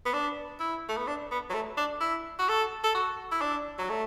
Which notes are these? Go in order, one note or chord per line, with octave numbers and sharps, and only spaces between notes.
B3
D4
E4
A3
B3
D4
B3
F#3
A3
D4
E4
F#4
A4
A4
F#4
E4
D4
F#3
A3